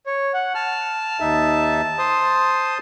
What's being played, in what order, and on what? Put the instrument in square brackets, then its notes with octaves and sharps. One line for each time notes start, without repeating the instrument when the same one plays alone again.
[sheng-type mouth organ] C#5
F#5
[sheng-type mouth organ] A5 [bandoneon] F6
[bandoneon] D#2 D#4 E5
C5 C6 D#6